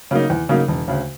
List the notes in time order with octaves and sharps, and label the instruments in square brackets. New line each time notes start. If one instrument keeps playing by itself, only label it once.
[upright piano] C#3 F#3 A#3 D#4
E2
C#3 F#3 A#3 D#4
E1
D2 C#3